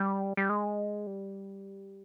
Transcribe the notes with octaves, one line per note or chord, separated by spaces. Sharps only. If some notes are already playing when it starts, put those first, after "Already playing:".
Already playing: G3
G3
G#3
G3